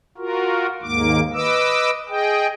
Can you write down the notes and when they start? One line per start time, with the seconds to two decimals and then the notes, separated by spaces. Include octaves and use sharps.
0.18 F4 F#4 A#4
0.82 D#2 G#2 A#3 D6
1.33 B4 D#5 D6 E6
2.09 G#4 D#5 G5